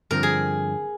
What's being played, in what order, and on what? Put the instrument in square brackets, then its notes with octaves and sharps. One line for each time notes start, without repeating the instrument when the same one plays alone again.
[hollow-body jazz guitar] G2 D3 F3 C4 [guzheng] A#4
[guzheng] G#4